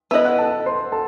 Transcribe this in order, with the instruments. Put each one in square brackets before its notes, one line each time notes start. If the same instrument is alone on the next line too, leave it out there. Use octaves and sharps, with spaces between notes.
[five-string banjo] B3 E4 B4 D#5 [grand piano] E5 E6
[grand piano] F#5 F#6
A4 A5
C5 C6
A4 A5